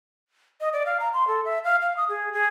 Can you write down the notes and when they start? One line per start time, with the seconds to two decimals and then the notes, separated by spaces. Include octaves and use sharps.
0.61 D#5
0.73 D5
0.86 F5
1.00 A#5
1.14 C6
1.28 A4
1.45 E5
1.64 F5
1.82 F5
1.97 D#6
2.09 G#4
2.33 G#4